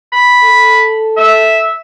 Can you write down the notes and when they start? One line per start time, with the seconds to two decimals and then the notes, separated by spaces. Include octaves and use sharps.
0.13 B5
0.43 A4
1.17 E5